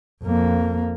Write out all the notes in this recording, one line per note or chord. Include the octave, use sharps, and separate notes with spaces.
F2 A#3